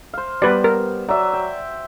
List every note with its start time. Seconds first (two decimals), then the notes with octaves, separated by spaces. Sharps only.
0.14 C5 F5
0.42 G3 B3 B4 D5
0.64 A#4
1.09 F#3 D5 E5
1.33 G5